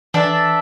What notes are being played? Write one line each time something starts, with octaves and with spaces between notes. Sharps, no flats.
E3 D4 A4 E5